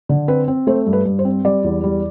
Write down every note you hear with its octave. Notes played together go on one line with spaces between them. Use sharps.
D3
C4 B4
C4
A3 C5
G2
B4
G2
C5
C4
G3 D5
E2
G3